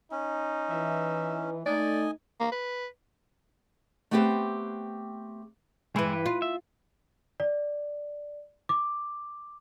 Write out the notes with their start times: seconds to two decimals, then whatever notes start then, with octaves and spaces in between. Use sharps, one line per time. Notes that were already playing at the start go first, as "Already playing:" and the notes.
0.12 C#4 D#4
0.70 E3 E5
1.66 A3 D#4 D5 D#5 G#5
2.40 A#3
2.52 B4
4.11 A3 B3 C4 G4 B4 C5
5.96 G2 E3 G#3 E4 B4
6.13 B4
6.26 F4
6.42 E5
7.40 D5
8.69 D6